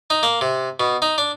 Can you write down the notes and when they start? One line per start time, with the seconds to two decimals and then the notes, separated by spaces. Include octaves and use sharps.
0.10 D#4
0.23 A#3
0.41 C3
0.80 B2
1.02 D#4
1.18 D4